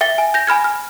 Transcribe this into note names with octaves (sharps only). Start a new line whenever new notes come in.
E5 G5 A6 G7
G#5
G6 A#6
G#5 B5 F6 G#6
F6